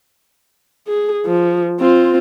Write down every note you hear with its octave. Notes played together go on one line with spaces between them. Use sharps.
G#4
F3
C4 F4